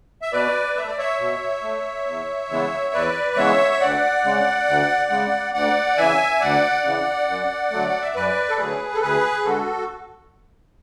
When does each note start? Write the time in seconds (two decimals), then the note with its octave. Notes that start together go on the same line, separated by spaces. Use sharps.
0.22 E5
0.32 B2 B4 D5
0.76 A3 E5
0.87 D5
0.98 C#5 E5
1.20 B2
1.63 A3
2.06 E2
2.50 C#3 E3 G#3 B3
2.93 E2 B4 D5
3.33 D5
3.37 C#3 E3 G#3 B3 C#5 E5
3.72 E5
3.80 D2 D5 F#5
4.24 C#3 G#3
4.67 D2
5.10 C#3 G#3
5.54 D2 D5 F#5
5.97 C#3 E3 E5 G#5
6.41 D2 D5 F#5
6.84 C#3 E3
7.28 F#2
7.71 D3 F#3 A3
7.89 F#5
8.02 E5
8.15 F#2 B4 D5
8.49 A4
8.58 D3 F#3 A3 G#4 B4
8.95 A4
9.01 D2 G#4 B4
9.45 D3 G#3 F#4 A4